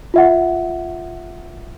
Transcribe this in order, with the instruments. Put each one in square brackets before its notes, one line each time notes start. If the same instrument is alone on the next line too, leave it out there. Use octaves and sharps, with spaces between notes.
[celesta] F4 E5 F#5